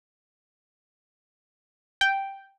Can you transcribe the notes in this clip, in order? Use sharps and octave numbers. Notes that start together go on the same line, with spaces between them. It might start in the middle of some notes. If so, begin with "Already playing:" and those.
G5